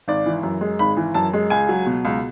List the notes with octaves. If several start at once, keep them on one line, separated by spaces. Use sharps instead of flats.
G#1 D5
E3
F#2
G#3
G#1 B5
E3
F#2 A5
G#3
C#2 G#5
F#3
B2
C#2